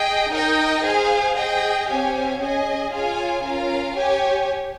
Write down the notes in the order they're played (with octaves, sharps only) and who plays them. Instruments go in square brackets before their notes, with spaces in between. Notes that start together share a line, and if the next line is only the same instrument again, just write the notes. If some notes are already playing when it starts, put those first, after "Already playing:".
Already playing: [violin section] G#4 D#5 G5
D#4 A#4 D#5 G5
G#4 C5 F5 G#5
G#4 D#5 G5
C4 G4 C#5 F5 G#5
C#4 G#4 D#5 G#5
F4 G#4 C#5 F5 G#5
C#4 F4 A#4 F5
G4 C#5 G#5